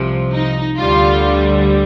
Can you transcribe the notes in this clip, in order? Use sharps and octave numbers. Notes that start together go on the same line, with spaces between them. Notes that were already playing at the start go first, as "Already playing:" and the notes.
Already playing: C2 C3 F3
D#4
D2 D3 G3 F4